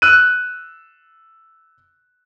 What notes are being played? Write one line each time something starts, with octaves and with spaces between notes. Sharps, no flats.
E6 F#6 D#7